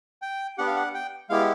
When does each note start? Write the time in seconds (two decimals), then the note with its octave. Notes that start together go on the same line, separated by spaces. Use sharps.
0.22 G5
0.58 B3 D4 G4 F#5
0.67 F5
0.76 F#5
0.94 G5
1.30 G#3 B3 E4 G4 F5